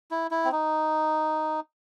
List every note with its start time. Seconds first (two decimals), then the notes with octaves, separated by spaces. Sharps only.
0.11 E4
0.31 E4
0.45 C4
0.52 D#4